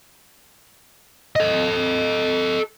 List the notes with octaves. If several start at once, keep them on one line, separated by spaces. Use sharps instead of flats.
A4 D#5